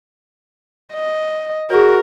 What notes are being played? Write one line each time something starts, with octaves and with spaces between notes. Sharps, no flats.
D#5
F#4 G#4 A#4 C#5